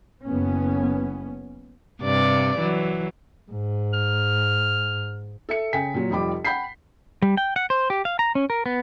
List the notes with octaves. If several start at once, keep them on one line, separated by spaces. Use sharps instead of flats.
F#1 B3 C#4
G2 C3 D5
E3 F#3
G#2
F6
A4 E5 C#7
C#3 G5 G#5 B6
A#2 F#3
F1 F3 G3 B5 D6
F#5 G5 B5 G6 B6 C7
G3
G5
F#5
C5
G4
F5
A#5
C#4
A#4
B3